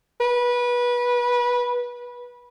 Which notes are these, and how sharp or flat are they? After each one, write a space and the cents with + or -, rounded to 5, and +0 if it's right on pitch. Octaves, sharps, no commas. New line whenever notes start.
B4 -20